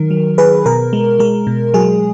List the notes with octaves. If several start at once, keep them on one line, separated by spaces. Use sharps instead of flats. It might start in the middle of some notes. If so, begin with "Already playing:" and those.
Already playing: D#3 F#3 A#4
F#3
D#3 G#4 B4
B2 A#4
G#3
G#3 A#4
B2
F#3 G#4